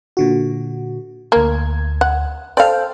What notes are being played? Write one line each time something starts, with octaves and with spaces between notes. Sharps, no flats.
A#2 D3 F#4
D2 A#3 G#6
F#5
A4 C5 D5 F5 G5